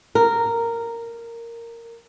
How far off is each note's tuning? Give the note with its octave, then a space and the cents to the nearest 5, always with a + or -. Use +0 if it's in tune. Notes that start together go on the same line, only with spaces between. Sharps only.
A#4 -10